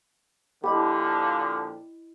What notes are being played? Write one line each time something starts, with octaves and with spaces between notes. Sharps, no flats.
A#2 D3 F3 E4 G4 D#5 B5